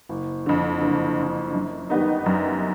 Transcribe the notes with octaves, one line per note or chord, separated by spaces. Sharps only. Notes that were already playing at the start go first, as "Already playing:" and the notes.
F#1
F2 D3
F#1
F2 D3
F#2
D#3 G3 B3 D#4
F#2